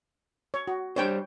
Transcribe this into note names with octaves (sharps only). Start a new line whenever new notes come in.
C#5
F#4
G3 D4 C5 C#5 G5